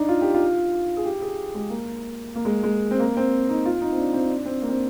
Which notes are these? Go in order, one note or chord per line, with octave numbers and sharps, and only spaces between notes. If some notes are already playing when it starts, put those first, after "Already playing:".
Already playing: D4 D#4
F4
G4
F4
G#4
G4
G#4
G#3
A#3
A#3
G#3
G#3
C4
A#3
C4
D#4
F4
D#4
C4
D4
C4
D4
C4
A#3
C4